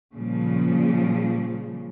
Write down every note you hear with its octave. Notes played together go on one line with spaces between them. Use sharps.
A#2 C#3 F3 G3